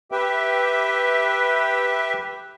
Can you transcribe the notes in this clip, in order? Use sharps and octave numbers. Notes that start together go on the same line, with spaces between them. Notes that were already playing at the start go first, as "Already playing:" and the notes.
G4 B4 E5 G5